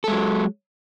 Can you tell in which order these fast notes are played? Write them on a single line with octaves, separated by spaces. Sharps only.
A4 G#3 F#3